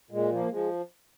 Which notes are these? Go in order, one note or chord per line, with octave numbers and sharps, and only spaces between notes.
A#2 G#3
F3 A#3
F3 G#3